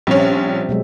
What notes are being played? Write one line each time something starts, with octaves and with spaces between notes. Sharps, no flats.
A#1 F3 G3 C4 C#4
E5
B2 F#3 G#3